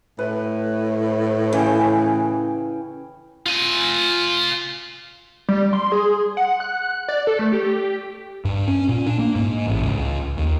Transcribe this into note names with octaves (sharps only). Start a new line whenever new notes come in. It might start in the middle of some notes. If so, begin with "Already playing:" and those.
A2 B4
C#3 E3 G5
F4 G#5
G3
C6
G#4
F#5
F#6
D5
A4
A3
G4
G2
C#4
A#2
D4
A#3
G#2
A1
C#2
D#2